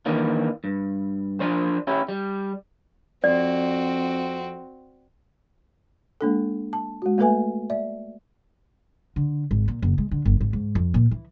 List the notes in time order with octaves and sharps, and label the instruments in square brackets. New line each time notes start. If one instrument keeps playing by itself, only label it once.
[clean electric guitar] D#3 E3 A#3 D4
G2
F3 D4 C5
C#4 E4 G4
G3
[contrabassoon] F2 [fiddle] C4 F#4 [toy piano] D5
[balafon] G#3 A#3 D4 A4
A5
G#3 F#4
A3 A#3 A4 B4 E5 G#5
D5 E5
[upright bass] D3
G#1
A#2
F#1
G#3
D3
G1
G#1
G#2
F2
A#2
E3